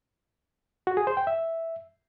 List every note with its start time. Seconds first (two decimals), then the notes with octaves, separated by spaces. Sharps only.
0.87 F#4
0.97 G#4
1.07 C5
1.17 G5
1.27 E5